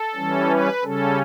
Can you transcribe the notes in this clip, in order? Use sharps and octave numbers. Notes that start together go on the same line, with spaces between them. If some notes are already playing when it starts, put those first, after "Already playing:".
Already playing: A4
E3 G3 C#4
B4
C#3 G3 C#4 A4